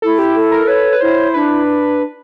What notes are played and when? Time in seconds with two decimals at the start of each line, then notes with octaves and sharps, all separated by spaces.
0.02 E4 A4
0.19 G4
0.36 A4
0.51 A#4
0.67 B4 C#5
0.92 B4
1.01 E4 C5
1.34 D4 B4